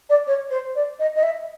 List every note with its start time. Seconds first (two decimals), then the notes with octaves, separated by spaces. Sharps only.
0.10 D5
0.27 C#5
0.51 C5
0.76 D5
0.99 D#5
1.16 D#5
1.23 E5